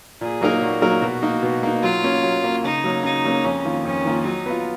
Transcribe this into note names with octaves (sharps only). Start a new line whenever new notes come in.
A#2 G#4
F#3 A#3 D#4 A#4
A#2 F#4
F#3 A#3 D#4 A#4
B2
A#3 D#4
B2
A#3 D#4
F#3 F4
A#3 C#4
F#3
A#3 C#4
C#3 D#4
F#3 A#3 C#4
C#3 D#4
F#3 A#3 C#4
F2 C#4
D#3 A#3 F4
F2 C#4
D#3 A#3 F4
F#3 D#4
B3 F4